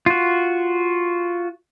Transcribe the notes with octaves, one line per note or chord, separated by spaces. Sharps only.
F4 F#4